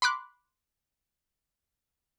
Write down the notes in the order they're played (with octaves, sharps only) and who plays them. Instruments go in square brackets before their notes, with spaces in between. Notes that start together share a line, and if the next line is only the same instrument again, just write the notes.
[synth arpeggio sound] B5 C6 D6 F#6